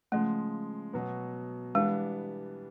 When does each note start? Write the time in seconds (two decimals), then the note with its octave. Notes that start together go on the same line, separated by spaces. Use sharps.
0.12 C#3 F3 G#3 A3
0.93 B2 F#3 B3
1.75 E3 G3 G#3 B3 D4